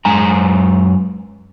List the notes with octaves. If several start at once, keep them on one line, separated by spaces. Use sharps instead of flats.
F#2 G#3 G#5 A#5